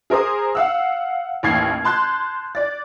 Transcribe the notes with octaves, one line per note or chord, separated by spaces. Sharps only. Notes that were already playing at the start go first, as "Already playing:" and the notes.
G#4 A#4 C5 D#6
F5 F#5 E6
A1 D#2 F6 G#6 C7
A5 C6 F#6 G6
D5 A6